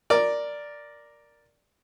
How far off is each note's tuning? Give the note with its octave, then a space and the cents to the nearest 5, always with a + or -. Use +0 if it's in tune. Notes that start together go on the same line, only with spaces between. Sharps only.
A#4 +0 D5 +0